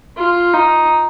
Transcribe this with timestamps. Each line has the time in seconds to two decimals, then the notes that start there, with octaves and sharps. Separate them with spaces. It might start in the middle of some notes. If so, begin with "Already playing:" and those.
0.17 F4
0.54 D#4